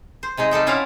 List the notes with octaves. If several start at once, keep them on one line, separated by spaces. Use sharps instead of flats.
C5
C3 G#3 D#4 G#4
G3 D#4 A4 G5
C#4 E4 F4 D5 F5 F#5